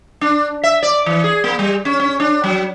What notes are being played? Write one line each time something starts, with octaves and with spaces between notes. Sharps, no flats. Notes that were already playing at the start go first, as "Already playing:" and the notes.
D4
E5
D5
E3
G#4
A#3
G3
C#4
C#4
D4
F#3